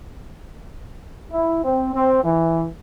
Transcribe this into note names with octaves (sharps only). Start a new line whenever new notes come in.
E4
C4
C4
E3